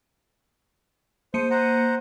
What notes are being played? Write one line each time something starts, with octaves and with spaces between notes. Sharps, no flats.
A#3 C5 C#7 D#7
C5 F#5 A#5